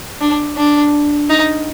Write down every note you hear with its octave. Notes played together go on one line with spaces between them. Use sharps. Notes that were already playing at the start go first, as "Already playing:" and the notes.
D4
D4
D#4